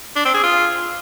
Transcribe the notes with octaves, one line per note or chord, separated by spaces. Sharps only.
D4
C4
G#4
F4